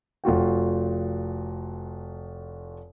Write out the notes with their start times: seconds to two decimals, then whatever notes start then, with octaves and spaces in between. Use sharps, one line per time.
0.24 F1 F4 F#4 G5